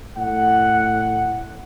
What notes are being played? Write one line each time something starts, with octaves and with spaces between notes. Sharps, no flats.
A2 F#5